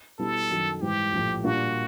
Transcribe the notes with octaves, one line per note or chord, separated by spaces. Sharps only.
B2 G3 B3 E4 A4
F#2 D#3 F#3
G#2 E3 G3 G4
A#1 A2 F3 A3
A#2 G3 A#3 D4 F4 F#4